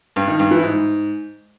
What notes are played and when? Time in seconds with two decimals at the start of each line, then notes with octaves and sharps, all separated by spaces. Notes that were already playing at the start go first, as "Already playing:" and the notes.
0.16 G2
0.28 D#3
0.39 G2
0.51 E3
0.63 G#2